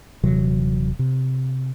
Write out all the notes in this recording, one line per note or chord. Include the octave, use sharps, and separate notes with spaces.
D#1 C3 E3 F#3
C3